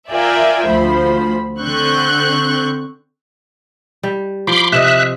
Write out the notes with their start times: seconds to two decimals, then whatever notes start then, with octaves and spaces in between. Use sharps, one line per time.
0.11 F4 A#4 D5 E5 G5 G#5
0.66 D2 F3 C5 B5
1.60 D3 C4 C#6 F#6 G6
4.03 G3
4.47 F3 B5 C6 D6
4.72 C3 D#5 E5 F#6